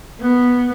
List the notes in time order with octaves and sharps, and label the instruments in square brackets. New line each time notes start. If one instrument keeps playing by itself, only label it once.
[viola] B3